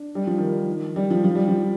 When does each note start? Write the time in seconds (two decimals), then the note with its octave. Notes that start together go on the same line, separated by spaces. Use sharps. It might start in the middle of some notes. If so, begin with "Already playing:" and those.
Already playing: D4
0.15 G3
0.27 F3
0.38 D#3
0.96 G3
1.10 F3
1.24 F3
1.35 G3
1.48 F3